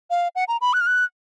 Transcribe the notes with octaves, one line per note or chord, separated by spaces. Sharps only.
F5
F#5
A#5
B5
F#6
F6
F#6